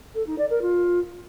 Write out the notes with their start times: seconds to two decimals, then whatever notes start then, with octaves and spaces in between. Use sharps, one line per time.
0.14 A4
0.26 D#4
0.38 D5
0.50 A#4
0.61 F4